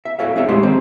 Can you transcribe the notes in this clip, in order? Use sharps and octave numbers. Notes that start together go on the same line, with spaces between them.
E5
F#4 A4 C#5 E5 F5
B3 D#4 G#4 C#5 E5
A2 G#3 G4 C5 C6
D#3 C4 G#4 C5